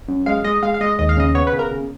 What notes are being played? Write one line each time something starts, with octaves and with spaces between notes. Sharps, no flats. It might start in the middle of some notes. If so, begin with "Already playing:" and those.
F#2
G#3 F5
G#3 D#5
G#3 F5
F5
G#3 D#5
D#2 D#5
F5
C#3 D#5
B3 C#5
B4
C#3
A#4
C#3